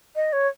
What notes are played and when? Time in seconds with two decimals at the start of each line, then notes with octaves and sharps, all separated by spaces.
0.16 D#5
0.33 C#5